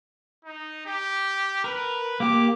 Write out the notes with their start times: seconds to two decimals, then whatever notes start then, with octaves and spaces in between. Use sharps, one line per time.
0.45 D#4
0.86 G4
1.64 A#4 B4
2.20 A#3 G4 D6